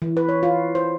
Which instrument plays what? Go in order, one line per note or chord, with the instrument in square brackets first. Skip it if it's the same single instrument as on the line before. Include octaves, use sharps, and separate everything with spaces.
[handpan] E3
B4
C#5
F4
C5